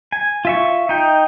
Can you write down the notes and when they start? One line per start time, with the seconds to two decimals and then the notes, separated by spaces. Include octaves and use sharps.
0.12 G#5
0.45 F4 E5 C#6
0.89 D#4 G5